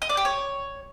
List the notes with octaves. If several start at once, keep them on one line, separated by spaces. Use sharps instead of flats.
D#5
D5
G4
C#5